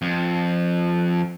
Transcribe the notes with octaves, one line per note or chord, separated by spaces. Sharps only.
F2